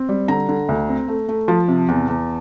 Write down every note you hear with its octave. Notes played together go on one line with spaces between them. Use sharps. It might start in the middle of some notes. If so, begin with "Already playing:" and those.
Already playing: C4
G3
D3 A#5
D3
D2
C4
A3
A3
F3 A5
C3
E2
E2